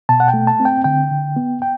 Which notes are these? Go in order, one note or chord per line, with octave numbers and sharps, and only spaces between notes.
B2 A5
F#5
G5
A3
A5
C4
G5
D3 G5
D3
B3
G5